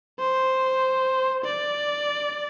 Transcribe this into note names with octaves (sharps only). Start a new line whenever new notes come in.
C5
D5